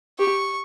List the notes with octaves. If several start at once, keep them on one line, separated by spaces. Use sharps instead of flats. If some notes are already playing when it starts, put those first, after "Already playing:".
G4 C#6